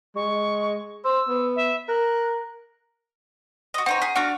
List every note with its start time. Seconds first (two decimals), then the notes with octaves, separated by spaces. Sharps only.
0.16 G#3 C#6
1.04 C5 E6
1.29 B3
1.56 E5
1.88 A#4 F#6
3.74 F#4 D#5
3.86 C4 D#4 C#5 F#5
4.02 G#4 B6
4.16 D4 F#4 F5 F#5 C#6 F6